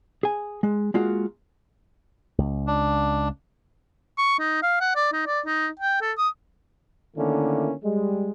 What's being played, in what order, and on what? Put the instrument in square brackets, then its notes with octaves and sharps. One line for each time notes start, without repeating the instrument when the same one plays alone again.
[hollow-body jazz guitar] G#4 G#5
G#3
G#3 A#3 F4 F#4
[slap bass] C#2
[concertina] D4
[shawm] C#6
D#4
F5
F#5
D5
D#4
D5
D#4
G5
A4
D#6
[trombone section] D3 D#3 A3 A#3 C#4 E4
G3 G#3